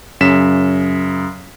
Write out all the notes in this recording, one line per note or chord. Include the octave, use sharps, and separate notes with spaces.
F#2 C#3 B6 E7